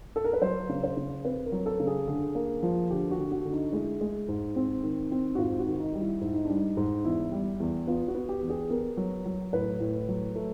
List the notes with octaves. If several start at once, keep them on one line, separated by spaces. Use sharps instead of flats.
A4
A#4
B4
F#3 C5
C#3
C5
C#3
C4 B4
A#4
F#3
A4
C#3
G#4
D3 G#4
A#3
F3
D3 G4
F#4
D3
F#4
D3
D#4
G#3 E4
G#3
G#2
C4
D#3
C4
F#4
G#2 F4
F#4
D#3
D#4
G3
E4
G#2 E4
D#4
G3 D4
D#4
G#2
E2 E4
G3
E2
B3 F4
F#4
B3
G4
E2
G#4
B3 A#4
F#3
F#3
A2 B4
A2
F#3
A3